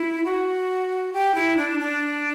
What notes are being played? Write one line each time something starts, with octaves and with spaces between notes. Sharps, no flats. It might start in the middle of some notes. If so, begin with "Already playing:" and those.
Already playing: E4
F#4
G4
E4
D4
D4